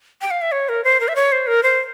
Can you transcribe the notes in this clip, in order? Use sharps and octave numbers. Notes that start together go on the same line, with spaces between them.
G5
F5
E5
C#5
A#4
C5
A#4
E5
C#5
C5
A#4
C5